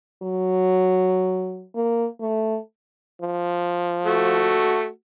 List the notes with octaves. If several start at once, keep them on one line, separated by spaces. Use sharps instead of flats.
F#3
A#3
A3
F3
A3 F#4